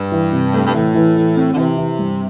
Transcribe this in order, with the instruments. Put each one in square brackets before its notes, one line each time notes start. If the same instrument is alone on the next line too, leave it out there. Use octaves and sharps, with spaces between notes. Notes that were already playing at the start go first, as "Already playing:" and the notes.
Already playing: [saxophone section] G2
[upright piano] E3
C3
A3
[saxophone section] G2
[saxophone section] A2 [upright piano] E3
[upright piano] E3
E3
C4
[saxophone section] D3
[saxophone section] C3 [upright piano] E3
[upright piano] E3
G2